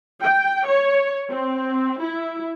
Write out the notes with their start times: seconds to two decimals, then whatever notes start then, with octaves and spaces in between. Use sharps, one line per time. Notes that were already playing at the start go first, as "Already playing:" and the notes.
0.23 G5
0.67 C#5
1.30 C4
2.01 E4